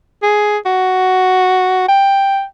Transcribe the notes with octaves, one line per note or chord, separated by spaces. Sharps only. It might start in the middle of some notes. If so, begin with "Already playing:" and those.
G#4
F#4
G5